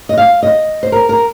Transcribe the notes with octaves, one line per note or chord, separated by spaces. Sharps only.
D#5
F5
D#5
C5
A#4
A#4